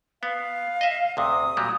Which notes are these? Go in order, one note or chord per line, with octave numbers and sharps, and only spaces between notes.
B3 F5
D#5 E5
D2 C3 D#6
A#2 F#3 G3